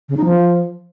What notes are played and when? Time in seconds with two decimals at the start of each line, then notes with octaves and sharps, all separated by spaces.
0.09 C#3
0.17 D#4
0.25 F3